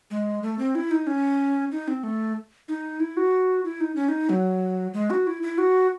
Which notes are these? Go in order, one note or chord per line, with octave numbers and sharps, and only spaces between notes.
G#3
A3
C4
E4
D#4
C#4
D#4
C4
A3
D#4
E4
F#4
E4
D#4
C#4
D#4
F#3
G#3
F#4
E4
E4
F#4